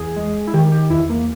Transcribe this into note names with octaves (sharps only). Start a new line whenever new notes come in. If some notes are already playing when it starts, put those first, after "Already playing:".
Already playing: E2 G#4
G#3
E4
D#3 G4
G4
E2 E4
A#3